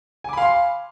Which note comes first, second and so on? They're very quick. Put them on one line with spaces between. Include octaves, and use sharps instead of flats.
G#5 D6 B5 F5 C6